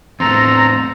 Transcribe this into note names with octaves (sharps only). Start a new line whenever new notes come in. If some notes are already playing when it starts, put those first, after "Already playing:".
E2 A2 C4 A4 A#5